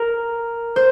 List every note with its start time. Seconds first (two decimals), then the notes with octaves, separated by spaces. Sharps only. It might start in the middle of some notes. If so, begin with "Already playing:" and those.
Already playing: A#4
0.76 C5